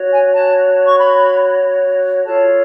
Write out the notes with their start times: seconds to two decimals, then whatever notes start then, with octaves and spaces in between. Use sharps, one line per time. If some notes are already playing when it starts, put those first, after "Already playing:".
Already playing: F#4 C#5
0.12 G#5
0.35 A5
0.86 C#6
0.98 B5
2.24 F4 A4 C#5 A5